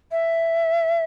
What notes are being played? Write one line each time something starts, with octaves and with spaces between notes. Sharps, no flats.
E5